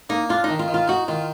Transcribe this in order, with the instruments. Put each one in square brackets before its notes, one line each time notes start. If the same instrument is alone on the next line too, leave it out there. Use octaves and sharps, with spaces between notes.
[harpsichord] A#3 [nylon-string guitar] D#4
[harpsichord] D4 [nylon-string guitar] F4
[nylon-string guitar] D#4
[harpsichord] D#3
[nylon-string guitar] F4
[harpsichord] D#3
[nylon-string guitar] F4
[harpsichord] D#4 [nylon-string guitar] F#4
[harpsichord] D#3 [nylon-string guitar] F4